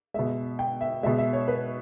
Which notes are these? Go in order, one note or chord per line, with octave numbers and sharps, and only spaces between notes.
B2 G#3 E5
G5
E5
B2 G#3 E5
E5
C#5
B4